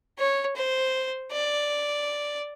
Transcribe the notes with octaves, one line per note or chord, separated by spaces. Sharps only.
C#5
C5
D5